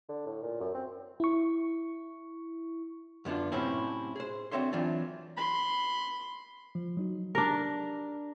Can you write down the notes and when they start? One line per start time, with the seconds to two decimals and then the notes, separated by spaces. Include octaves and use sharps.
0.09 D3
0.26 A2
0.42 A#2
0.60 F#2
0.75 C4
1.20 E4 C#6
3.25 F#2 D3 B3 D4 F4
3.52 A2 C3 F#3 C4 C#4 E4
4.16 G#4 C5
4.51 D3 C4 F#4 C#5 E5 C6
4.72 E3 F#3 C4 D4 F4
5.37 B5 C6
6.75 F3
6.97 F#3 D#4 F#4
7.35 D4 G4 A#4